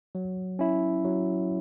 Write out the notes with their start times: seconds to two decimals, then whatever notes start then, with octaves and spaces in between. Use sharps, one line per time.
0.15 F#3
0.59 C#4 E4
1.04 F#3